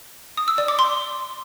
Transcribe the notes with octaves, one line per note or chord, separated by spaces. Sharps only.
D#6
E6
D5
D6
C6